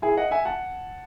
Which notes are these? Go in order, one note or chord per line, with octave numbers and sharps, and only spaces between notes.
E4 G#4
D#5 F#5
E5 G#5
F#5 A5